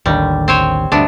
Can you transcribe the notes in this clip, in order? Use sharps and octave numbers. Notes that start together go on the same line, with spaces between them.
A1 D#2 D3 G3
C4 C5 C#5
D2 G2 C3 B3 D4